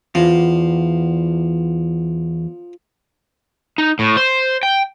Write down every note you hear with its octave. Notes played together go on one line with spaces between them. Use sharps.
E2 F3
D#4
A2
C5
G5